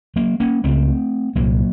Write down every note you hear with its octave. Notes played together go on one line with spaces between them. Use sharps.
F#3 A#3
A#3 C#4
C#2 C#3 A3 C4
C2 A#2 F#3 A#3